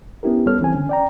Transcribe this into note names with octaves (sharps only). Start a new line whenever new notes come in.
B3 C#4 E4 G4 A#4
C#2 G3 B3 A4 C#5 F6
E3 C4 G#5
D3 C#4
D5 G5 A#5